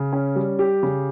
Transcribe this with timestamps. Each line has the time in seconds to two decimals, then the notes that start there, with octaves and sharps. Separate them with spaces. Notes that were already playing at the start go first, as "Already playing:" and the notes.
Already playing: C#3
0.13 C#4
0.36 G3
0.59 G4
0.83 C#3